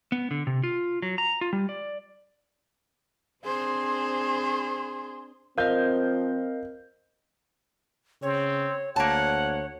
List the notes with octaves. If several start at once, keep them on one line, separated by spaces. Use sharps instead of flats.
B3
D3
C3
F4
F#3
A#5
F4
G3
D5
C4 D4 G#4 C5 C6
F3 C4 A#4 D#5 F5 G6
C#3 C4 C#5
D2 A#3 C#5 F#5 A5